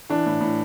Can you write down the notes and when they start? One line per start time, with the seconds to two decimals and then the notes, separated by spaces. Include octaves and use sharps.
0.09 E3 D4
0.26 A2
0.41 A2